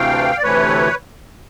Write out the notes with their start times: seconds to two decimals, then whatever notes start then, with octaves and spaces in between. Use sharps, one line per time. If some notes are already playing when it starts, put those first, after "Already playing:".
Already playing: D2 C3 E3 A3 F5 G5
0.38 D5
0.43 D2 C3 E3 A3 B4 C#5